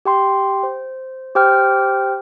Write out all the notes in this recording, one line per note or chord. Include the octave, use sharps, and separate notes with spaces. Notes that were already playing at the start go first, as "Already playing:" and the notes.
G4 G5 C6
C5
G4 C5 G5 F6